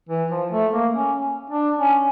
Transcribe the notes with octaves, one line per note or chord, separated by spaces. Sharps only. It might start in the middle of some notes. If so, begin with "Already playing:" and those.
E3
F3
A3
A#3
C#4
D4
C#4